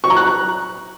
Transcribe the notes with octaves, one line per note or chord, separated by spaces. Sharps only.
C#6
A#5
F#6